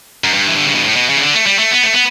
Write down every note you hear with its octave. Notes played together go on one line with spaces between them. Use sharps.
F#2
G2
E3
D3
C#3
B2
A2
B2
C#3
E3
D3
A3
G3
A3
B3
A3
B3